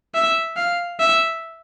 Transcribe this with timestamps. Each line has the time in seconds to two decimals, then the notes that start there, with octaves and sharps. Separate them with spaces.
0.14 E5
0.57 F5
0.99 E5